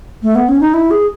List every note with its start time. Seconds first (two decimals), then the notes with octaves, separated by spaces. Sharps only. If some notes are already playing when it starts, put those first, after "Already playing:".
0.22 A3
0.35 B3
0.48 C#4
0.61 D#4
0.74 E4
0.91 G#4